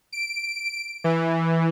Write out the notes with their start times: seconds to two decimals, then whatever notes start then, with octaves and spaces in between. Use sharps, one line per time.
0.13 D7
1.04 E3